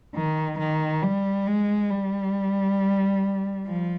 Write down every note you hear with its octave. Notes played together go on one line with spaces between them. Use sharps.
D#3
D#3
G3
G#3
G3
F3